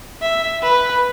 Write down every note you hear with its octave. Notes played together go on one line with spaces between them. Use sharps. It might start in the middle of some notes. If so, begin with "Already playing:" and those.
E5
B4